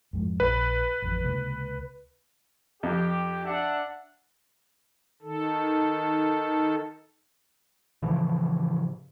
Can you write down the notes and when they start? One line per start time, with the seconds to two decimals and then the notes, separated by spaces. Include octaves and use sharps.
0.13 F2 G#2 F3
0.40 A#1 B4
1.02 A1 F2
1.24 C#2 C3 A#3
2.83 F2 G4
3.45 D4 E5 F#5
5.22 D#3 A4
8.02 A2 C#3 E3 F3